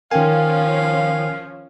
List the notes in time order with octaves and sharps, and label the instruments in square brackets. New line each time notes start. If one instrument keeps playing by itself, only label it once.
[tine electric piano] D#3 G#5 [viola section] F3 C#4 [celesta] A#4 G5 [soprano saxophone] F5